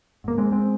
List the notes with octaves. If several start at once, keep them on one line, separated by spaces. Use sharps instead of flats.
G#2 A#3
G#3 C4
G#3 C4